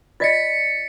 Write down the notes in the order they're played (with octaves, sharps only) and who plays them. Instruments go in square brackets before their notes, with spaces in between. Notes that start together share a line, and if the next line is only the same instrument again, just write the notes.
[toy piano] F4 D5 D#5 [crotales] A6 B6 C#7